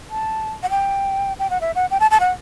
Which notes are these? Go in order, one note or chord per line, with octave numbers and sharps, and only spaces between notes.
A5
F#5
G5
G5
F#5
E5
F#5
G5
A5
A5
F#5